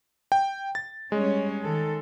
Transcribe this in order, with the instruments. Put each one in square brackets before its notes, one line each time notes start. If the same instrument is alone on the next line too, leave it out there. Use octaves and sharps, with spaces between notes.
[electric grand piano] G5
A6
[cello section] G3 C#4 [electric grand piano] G#3
[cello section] D#3 A4